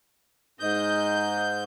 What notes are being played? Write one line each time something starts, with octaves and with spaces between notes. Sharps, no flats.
G#2 D#5 G6